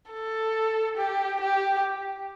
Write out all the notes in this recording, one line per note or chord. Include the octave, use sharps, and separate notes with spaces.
A4
G4
G4